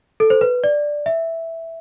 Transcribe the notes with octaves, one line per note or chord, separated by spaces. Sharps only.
A4
C5
B4
D5
E5